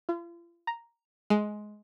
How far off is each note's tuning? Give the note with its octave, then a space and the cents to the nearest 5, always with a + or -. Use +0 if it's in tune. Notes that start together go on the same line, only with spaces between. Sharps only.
F4 -40
A#5 +0
G#3 +15